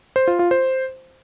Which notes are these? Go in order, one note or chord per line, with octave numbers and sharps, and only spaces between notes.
C5
F4
F4
C5